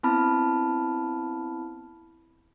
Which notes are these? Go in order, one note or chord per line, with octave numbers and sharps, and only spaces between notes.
B3 C4 E4 A5 B5 F6